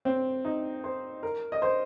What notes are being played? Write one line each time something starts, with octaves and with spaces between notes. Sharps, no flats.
C4
D#4
C5
A#4
D#5
C5